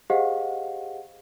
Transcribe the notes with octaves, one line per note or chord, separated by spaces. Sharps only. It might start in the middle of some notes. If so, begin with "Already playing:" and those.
G4 G#4 C5 D#5 F5 F#5